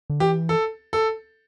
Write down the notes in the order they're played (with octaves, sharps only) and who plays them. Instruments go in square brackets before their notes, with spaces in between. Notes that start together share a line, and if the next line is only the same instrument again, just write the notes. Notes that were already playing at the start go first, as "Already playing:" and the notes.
[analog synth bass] D3
[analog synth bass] E3 [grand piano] G4
[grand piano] A4
A4